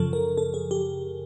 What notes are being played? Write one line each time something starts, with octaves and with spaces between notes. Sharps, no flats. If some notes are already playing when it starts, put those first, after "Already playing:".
Already playing: F#2 C#3 F3 A4
A#4
A4
G#4
G4